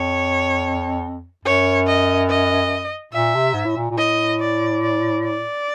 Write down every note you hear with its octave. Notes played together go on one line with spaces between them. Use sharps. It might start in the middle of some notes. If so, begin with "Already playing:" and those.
Already playing: F2 C#5
F#2 C#5
D#5
D#5
A#2 E5
C3
G#2
A2
A#2
A#2
A2 D#5
D5
D5
D5